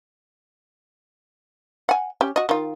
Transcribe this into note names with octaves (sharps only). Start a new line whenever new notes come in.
F#5 G#5
C#4 G4
F#4 D#5
D#3 F4